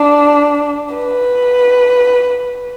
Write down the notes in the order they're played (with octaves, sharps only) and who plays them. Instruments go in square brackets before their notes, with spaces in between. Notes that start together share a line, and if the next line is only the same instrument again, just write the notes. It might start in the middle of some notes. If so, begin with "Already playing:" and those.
Already playing: [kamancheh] D4
B4